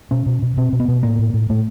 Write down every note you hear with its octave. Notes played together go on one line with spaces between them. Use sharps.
B2 C#4
B2
B2
B2 C4
B2
B3
B2
A2 A#3
A2
A2
A2 A3